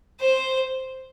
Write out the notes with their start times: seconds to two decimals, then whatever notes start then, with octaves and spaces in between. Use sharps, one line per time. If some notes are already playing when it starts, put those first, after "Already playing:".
0.20 C5